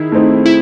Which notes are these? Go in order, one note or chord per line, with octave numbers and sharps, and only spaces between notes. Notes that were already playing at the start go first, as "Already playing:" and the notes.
Already playing: D#3 E4 G#4
A3 C4 D#4
E4